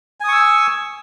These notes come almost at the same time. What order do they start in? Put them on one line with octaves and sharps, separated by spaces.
G#5 D#6 C#6 E6